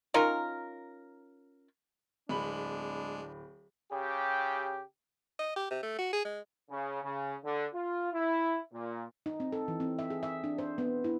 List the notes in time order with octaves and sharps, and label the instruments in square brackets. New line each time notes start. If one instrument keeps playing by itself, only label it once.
[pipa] C#4 D#4 F4 A#4
[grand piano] D1 B5 F#7 [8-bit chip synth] G#3 [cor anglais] D4
[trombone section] C#3 G4
[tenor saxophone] D#5
G4
C3
A3
F#4
G#4
G#3
[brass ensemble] C#3
C#3
D3
F4
E4
A#2
[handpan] D#4
C4
A4
E3
C4
E5
G#4
E5
D4
C5
B3
E4